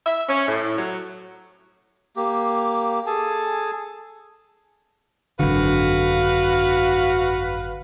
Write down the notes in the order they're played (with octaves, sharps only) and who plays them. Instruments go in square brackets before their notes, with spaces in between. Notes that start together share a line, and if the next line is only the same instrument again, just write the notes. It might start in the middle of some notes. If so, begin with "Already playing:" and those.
[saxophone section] E5
C#4
A2
F#3
[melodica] A#3 G4
G#4 A4 G#5 A5
[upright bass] G#1 F#2 [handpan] D3 [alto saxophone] F#4 [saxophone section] B4 F5